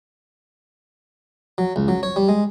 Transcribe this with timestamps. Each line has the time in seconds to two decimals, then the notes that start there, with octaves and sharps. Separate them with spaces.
1.58 F#3
1.76 C#2
1.88 F#3
2.03 C#5
2.16 G3
2.29 G#3